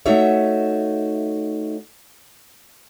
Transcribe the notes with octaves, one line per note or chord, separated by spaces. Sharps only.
A3 D#4 F#4 C#5 E5